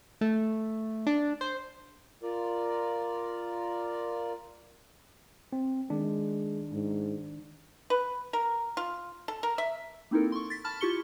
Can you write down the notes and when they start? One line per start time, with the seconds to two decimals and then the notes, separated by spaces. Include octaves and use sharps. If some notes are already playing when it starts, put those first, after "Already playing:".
0.21 A3
1.07 D4
1.41 C5
2.23 F4 A#4 D5
5.53 C4
5.90 D#3 G#3 D4
6.72 G#2
7.90 B4
8.33 A#4
8.77 F4
9.28 A4
9.43 A#4
9.58 E5
10.11 A#3 C4 D#4 E4 A4 A#4
10.32 C6 C#6
10.50 A6 B6
10.64 A5 B5 F6
10.81 E4 F4 G4 C#6 C#7 G7